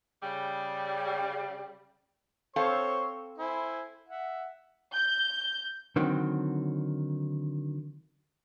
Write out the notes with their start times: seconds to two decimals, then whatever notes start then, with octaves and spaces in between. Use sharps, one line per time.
0.23 C#3 G3
2.56 C4 A4 C5 C#5 F5 C#6
3.38 E4 C5 G#5
4.09 E5 F#5
4.93 G6
5.96 D3 D#3 F#3 C4